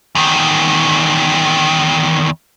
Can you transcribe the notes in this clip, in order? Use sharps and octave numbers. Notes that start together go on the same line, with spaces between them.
E2 D#3